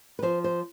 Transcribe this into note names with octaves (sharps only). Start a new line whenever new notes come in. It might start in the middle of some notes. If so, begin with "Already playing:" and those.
B4
F3 C5
C5